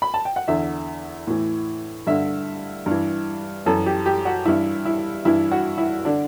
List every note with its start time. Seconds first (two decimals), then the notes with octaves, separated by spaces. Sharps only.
0.02 B5
0.14 A5
0.25 G5
0.36 F#5
0.48 E2 D3 E5
1.27 A2 E3
2.07 G2 D3 E5
2.86 G2 E3
3.66 F#2 E3 A4
3.86 G4
4.06 G4
4.25 F#4
4.45 G2 E3 E4
4.85 E4
5.25 G2 E3 E4
5.52 F#4
5.78 E4
6.05 D3 D4